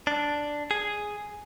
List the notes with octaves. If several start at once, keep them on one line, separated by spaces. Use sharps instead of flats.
D4
G#4